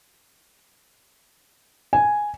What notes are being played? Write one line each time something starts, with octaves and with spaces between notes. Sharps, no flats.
G#5